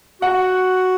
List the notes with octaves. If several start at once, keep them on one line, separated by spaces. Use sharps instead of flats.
F#4 F#5